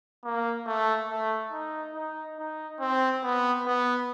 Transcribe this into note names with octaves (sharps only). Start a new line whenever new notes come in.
A#3
A3
A3
D#4
D#4
D#4
C4
B3
B3